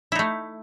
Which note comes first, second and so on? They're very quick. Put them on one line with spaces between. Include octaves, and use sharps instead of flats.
E4 D#4 A3